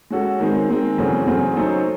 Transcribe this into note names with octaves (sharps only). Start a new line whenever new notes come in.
G#3 C#4 F#4 A4
D#3 G#3 C4
D#3 G#3 C4
E2 C#3 F#3 A3 C4
E2 C#3 F#3 A3 C4
F#3 A3 D#4 A4 C5